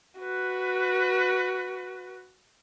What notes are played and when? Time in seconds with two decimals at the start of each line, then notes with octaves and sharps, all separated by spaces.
0.19 F#4 B4